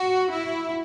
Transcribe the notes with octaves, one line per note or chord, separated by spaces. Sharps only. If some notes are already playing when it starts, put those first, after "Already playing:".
Already playing: F#4
E4